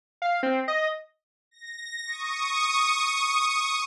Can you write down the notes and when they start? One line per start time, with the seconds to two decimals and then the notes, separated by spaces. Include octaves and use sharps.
0.22 F5
0.43 C4
0.68 D#5
1.51 A#6
2.06 C#6 D#6